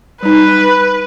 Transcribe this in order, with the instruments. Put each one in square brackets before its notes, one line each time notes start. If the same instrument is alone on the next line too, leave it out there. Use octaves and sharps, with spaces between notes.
[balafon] G3 D#4 [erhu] B4